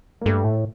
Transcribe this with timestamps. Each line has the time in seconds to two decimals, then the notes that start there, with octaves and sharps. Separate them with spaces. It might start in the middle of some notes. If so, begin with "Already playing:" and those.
0.21 A#3
0.26 G2 A3
0.45 A2